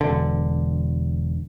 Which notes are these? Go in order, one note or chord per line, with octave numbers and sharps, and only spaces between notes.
E1 D3